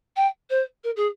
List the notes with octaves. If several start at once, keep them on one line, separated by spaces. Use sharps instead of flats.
G5
C5
A#4
G#4